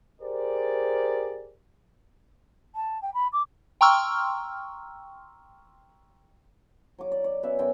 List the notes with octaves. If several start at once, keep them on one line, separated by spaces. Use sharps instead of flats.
G4 G#4 A#4 C5 D5
A5
G5
B5
D6
G5 A#5 C6 C#6 E6 F6
F#3 D6
D5
D5
B2 C#4 B4 E5
F#2 E5 G5